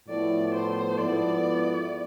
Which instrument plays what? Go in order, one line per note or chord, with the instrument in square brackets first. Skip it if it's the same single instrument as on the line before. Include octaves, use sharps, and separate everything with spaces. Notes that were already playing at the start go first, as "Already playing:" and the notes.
[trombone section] A2 F3 B3 E4 A4 [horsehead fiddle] D5
[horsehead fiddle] C5
[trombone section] G#2 F3 B3 E4 A4 [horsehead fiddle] D5